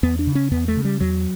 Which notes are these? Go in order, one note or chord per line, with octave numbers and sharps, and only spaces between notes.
E2 B3
D4
C#3
C#4
E2 B3
A3
C#3
G3
E2 F#3